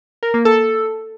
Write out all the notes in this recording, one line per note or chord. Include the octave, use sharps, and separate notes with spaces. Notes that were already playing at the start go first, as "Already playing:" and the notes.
A#4
A#3
A4